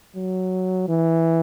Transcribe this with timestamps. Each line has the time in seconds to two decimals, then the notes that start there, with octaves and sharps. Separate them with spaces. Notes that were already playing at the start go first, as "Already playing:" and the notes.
0.16 F#3
0.88 E3